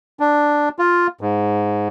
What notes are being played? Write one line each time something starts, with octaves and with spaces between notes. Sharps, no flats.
D4
F4
G#2